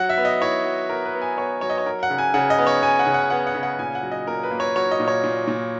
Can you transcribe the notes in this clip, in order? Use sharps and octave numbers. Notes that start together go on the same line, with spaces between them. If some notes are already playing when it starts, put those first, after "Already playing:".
Already playing: F#3 F#5
E5
B3
D#5
E4 C#5
F#3
B3 A#4
B4
B3
G#5
B3 C#5
F#3 C#5
D#5
C#5
F#3 A#4
F#5
C#3
G#5
C#3 F#5
D#5
B3
C#5
B3 G#5
F#5
C#3
F#5
B3 F#5
F#5
C#3
F#5
A#2 G#5
F#5
F#3
D#5
A#2 A#4
B4
A#3
C#5
F#3 C#5
D#5
A#2
C#5
A#2
A#2